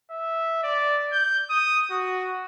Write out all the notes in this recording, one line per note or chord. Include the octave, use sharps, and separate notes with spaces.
E5
D5
G6
D#6
F#4